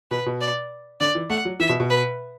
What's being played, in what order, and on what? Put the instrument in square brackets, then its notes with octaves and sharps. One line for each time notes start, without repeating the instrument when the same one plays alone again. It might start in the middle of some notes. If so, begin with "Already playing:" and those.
[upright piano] B2 [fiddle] B4
[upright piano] B2
[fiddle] D5
[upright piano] D3 [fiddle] D5
[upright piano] E3
[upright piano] A3 [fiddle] F#5
[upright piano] F#3
[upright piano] E3 [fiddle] E5
[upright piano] B2
B2
[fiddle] B4